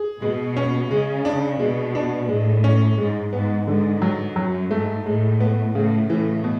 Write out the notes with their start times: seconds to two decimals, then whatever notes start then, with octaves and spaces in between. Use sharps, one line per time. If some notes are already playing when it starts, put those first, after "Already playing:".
Already playing: G#4
0.21 B2 G#3
0.57 C#4
0.90 C#3 G#3
1.25 D4
1.60 B2 G#3
1.95 D4
2.29 A2 G#3
2.64 C#4
2.98 G#2 G#3
3.33 G#2 B3
3.67 G#2 D3
4.02 F#3
4.36 F#2 F#3
4.71 G#2 A3
5.05 A2 G#3
5.40 B3
5.75 A2 C#3
6.09 A2 E3
6.44 B2